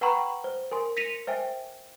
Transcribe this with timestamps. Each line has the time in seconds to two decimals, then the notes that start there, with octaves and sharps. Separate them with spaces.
0.01 B4 F#5 G5 A#5 B5 C#6
0.44 C5
0.71 A#4 G#5 C6
0.97 A#6 B6 C#7 D#7 F7
1.27 C5 E5 G5 G#5